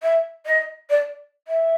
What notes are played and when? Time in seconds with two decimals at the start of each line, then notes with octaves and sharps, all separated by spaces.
0.02 E5
0.46 D#5
0.90 D5
1.47 E5